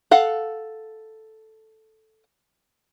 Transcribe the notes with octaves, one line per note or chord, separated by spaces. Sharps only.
A4 F5 F#5